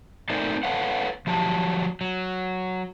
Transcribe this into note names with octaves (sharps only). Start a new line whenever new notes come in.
A3 C4 D#4 A#4 C5 D5
A4 B4 C#5 F5 F#5
F3 F#3 G4 A5
F#3